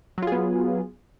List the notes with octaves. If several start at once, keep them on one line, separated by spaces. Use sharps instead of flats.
F#3 B3 F4 G#4